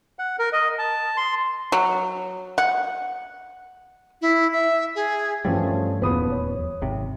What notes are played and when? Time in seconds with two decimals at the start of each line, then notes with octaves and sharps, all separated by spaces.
0.19 F#5
0.39 A#4
0.53 D#5
0.79 A5
1.17 C6
1.72 F#3
2.58 F#5
4.21 E4
4.53 E5
4.95 G#4
5.45 G2 E3 F3 G3 A3 C#4
6.02 D#1 E2 F3 B3 B5 D#6
6.32 C#5
6.82 G#1 C3